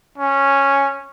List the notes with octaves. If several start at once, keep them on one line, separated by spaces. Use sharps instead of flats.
C#4